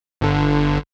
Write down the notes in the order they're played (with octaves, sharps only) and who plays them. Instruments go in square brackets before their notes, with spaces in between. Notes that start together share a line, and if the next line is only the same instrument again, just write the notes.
[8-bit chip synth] G1 D3